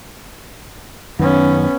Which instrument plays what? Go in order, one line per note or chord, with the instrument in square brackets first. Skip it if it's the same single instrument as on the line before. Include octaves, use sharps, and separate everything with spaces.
[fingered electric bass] F#2 D#3 [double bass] B3 C#4